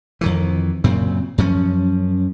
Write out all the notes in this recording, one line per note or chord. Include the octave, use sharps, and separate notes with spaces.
F2 D#3 E3
F#2 A#2 C#3 C4
F#2 F3 C#4